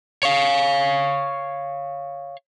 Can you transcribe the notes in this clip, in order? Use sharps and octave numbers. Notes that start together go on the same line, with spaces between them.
C#5 F5